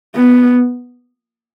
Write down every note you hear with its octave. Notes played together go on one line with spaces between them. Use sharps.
B3